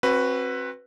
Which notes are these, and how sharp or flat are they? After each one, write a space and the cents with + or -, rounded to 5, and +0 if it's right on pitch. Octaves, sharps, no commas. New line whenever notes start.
C4 +35 F#4 +0 B4 +0